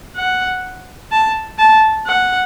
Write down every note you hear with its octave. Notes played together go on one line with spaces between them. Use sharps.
F#5
A5
A5
F#5